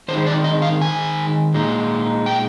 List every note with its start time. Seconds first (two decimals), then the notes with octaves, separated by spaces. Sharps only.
0.08 D#3 G#3 D#4 C5
0.27 D5
0.44 D#5
0.62 F5
0.81 G#5
1.54 A#2 G#3 D#4
2.26 G5